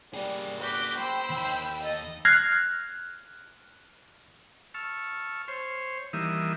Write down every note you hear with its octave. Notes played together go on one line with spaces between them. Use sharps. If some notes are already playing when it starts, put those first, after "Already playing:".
G3 A#3 G#4
F#4 D6 G6 B6
C5 G5 B5 E6
D#2
A4 D#5
F6 F#6 G#6 A#6 C7
A5 C#6 E6 F6
C5 C#5
D#3 E3 G3 A#3 E5 D#6